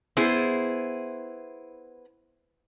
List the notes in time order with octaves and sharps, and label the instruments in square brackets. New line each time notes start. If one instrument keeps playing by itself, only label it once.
[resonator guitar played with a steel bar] B3 E4 G#4 C5